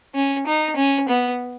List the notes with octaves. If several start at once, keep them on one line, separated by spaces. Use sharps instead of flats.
C#4
D#4
C#4
B3